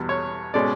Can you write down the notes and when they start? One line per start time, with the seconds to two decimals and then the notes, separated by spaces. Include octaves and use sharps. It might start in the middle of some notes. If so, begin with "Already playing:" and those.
Already playing: E2 B2 G3 B3
0.09 C#5
0.54 B2 G#3 C#4 D5